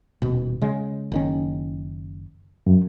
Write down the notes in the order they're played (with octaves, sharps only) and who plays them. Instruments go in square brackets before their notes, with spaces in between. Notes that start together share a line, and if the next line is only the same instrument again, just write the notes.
[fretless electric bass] D#1 B2
C#3 G#3
F#1 D#3 C#4
[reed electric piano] F#2